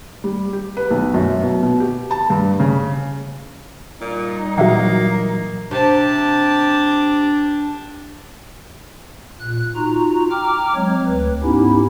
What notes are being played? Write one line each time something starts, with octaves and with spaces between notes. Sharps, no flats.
G3
G4
B4
B1
F#2
B2
B2
G4
A5
G2
C#3
A#2 G3 D#4
A#2 E3 F#3 A#3 F#4 E5 F#5
C3 D4 G4 A5
A#2 F#6
D#4 F4 F#4 A#5
G5 A#5 D6 F6
F#3 G#3 C4 C#5
D2 B4
G#2 B3 C#4 D#4 E4 G4